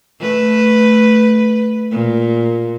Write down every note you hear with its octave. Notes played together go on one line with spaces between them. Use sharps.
A3 B4
A#2